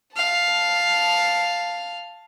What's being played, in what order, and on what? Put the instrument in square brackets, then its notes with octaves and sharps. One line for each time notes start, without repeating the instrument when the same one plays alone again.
[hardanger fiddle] F5 A5